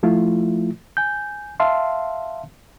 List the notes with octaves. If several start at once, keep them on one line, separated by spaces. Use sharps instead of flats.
F3 A3 E4 F4
G#5 G6
E5 F5 A5 C6